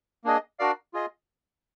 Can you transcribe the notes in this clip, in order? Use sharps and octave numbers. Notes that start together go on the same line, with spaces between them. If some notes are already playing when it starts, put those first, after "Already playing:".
A#3 D4 G#4 D#5
D4 F#4 A#4 D5 F5
F4 G#4 D#5